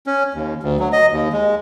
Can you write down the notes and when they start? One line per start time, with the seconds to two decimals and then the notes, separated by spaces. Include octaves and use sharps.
0.06 C#4
0.34 D#2
0.63 D2
0.80 F#3
0.93 D#5
1.13 D#2
1.32 G#3